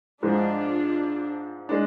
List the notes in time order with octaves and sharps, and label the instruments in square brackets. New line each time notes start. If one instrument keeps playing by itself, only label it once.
[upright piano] G#2 F3 G#3 [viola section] D4 F4
[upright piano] G#3 D4